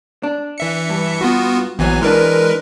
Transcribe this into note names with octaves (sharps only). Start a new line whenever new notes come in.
D4
E3 E5 C#7
G2
B3 F4 F#4
A#1 E2 E3 F#3 G#5
E3 G#3 D4 A#4 B4